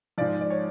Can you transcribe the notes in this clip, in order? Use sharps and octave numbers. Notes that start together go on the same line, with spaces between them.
G#2 F3 D5
D5
C#5